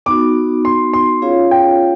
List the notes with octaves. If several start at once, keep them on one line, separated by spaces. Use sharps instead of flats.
B3 D#4 F#4 D6
C6
C6
C#4 F4 G#4 C#5 F5
G5